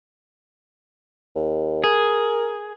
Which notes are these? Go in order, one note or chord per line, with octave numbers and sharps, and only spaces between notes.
D#2
G#4 A#4